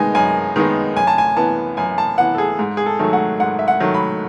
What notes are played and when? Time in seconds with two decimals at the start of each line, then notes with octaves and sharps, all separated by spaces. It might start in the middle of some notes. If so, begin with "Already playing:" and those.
Already playing: D#3 G#3 B3 D#4 G#5
0.15 F#2 G#5
0.56 D#3 G#3 B3 D#4
0.96 F#2 G#5
1.07 A5
1.18 G#5
1.37 E3 B3 A5
1.77 F#2 G#5
1.98 A5
2.18 E3 B3 F#5
2.35 A4
2.38 G#4
2.59 G#2
2.77 G#4
2.86 A4
2.99 D#3 F#3 A3
3.13 F#5
3.40 G#2 F#5
3.59 E5
3.68 F#5
3.80 D#3 F#3 A3
3.94 B5